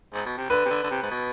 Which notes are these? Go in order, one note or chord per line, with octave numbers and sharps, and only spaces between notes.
G#2
B2
C3
D3 B4
C3
D3
D3
C3
G#2
B2